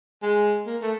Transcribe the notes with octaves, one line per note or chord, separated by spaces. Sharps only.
G#3
A#3
A3